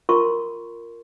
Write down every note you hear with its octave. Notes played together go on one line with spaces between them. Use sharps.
F4 A#4 C6 C#6